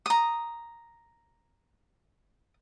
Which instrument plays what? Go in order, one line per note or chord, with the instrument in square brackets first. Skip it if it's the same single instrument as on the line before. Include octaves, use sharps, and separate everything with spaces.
[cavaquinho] A#5 D#6